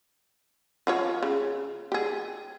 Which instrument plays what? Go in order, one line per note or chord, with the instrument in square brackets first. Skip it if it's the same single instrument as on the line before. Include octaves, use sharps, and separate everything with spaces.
[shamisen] F3 F4 C#5
C#3
G4 G#4